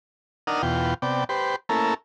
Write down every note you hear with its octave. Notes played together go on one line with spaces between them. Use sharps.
D4 D#4 A#4 F#5 D#6 F6
E2 B2 F4 G5
C3 B3 D5 G5
G4 B4 C5
A3 A#3 C#4 E4 A4 A#4